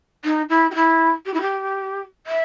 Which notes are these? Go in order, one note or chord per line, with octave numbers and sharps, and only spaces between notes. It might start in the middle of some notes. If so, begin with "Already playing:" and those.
D#4
E4
G4
E4
G4
E4
G4
E5